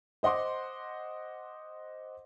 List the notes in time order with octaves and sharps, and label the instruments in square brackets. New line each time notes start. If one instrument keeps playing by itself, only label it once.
[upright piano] C5 D#5 F#5 C6 D6